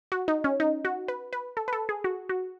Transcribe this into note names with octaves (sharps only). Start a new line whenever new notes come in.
F#4
D#4
C#4
D#4
F#4
B4
B4
A4
B4
A4
G#4
F#4
F#4